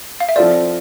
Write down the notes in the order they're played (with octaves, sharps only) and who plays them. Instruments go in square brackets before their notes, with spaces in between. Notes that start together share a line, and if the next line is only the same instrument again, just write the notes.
[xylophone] F5
E5
[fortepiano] F3 C4 F4 A4 C5 [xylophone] D5